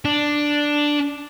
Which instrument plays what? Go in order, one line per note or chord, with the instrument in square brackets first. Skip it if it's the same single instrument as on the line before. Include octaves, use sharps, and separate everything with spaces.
[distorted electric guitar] D4